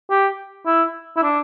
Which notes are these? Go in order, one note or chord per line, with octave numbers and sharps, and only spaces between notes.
G4
E4
E4
D4